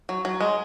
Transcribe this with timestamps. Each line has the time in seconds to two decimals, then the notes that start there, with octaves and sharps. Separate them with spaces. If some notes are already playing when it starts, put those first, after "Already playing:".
0.09 F#3
0.25 F#3
0.41 G#3